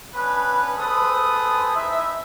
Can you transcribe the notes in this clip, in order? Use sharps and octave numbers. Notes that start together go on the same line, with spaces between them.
B3 C#4 D4 B4
G#4 A4 B4 C5 D#6
D#4 E4 E5